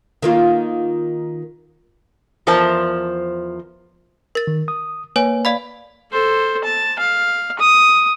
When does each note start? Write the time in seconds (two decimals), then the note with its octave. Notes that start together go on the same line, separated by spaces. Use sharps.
0.22 D#3 A#3 F4
2.47 E2 F3 A#4 C5 A5
4.35 A#4 A6
4.47 D#3
4.68 D#6
5.16 A#3 B4 C#5 G#5
5.45 D5 F5 B5
6.12 A4 C5
6.64 A5
6.99 F5
7.59 D#6